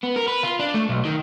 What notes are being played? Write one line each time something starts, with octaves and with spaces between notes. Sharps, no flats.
B3
A#4
B4
F4
D4
A3
B1
D#3